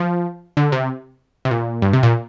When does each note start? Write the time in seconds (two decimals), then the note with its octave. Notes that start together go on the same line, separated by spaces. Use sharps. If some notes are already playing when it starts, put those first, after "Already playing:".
Already playing: F3
0.57 D3
0.72 C3
1.45 C3
1.51 A#2
1.82 G2
1.93 C3
2.03 A#2